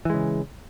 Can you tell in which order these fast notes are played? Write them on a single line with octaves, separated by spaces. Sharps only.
E3 G#3 C#3